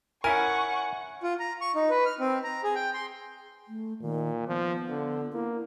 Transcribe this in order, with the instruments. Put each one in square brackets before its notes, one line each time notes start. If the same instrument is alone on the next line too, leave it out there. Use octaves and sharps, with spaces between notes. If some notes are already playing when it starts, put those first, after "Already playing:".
[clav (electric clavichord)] C#4 E4 A#4 [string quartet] F#5 C#6 [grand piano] G#5
[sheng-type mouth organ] F4
A#5
C#6
D#4
B4
F6
C4
A#5
G#4
G5
C6
[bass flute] A3
[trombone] A#2 [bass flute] D#3
[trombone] F3 [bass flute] B3
[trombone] D3
[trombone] A#3 [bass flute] E4